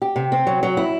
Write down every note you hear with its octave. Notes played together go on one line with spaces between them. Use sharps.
G4
C3
C4
F#3
F#3
E4